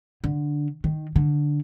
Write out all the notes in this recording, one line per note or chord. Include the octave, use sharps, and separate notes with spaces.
D3
D#3
D3